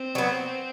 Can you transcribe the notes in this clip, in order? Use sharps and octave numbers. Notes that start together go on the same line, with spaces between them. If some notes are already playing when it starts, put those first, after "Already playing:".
Already playing: C4
F#3 B3